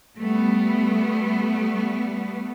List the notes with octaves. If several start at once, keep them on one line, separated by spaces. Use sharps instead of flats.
G3 A3 B3